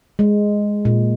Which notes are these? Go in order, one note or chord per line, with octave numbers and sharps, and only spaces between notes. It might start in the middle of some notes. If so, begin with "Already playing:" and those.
G#3
A#2